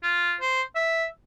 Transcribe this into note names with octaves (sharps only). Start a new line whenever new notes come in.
F4
C5
E5